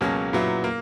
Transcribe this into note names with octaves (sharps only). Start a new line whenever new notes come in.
C#2 B2 F#3 A#3 C#4
A#2 F#3 B3 E4
A#3